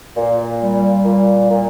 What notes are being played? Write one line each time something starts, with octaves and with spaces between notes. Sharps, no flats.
A#2
G3
A#2
A#2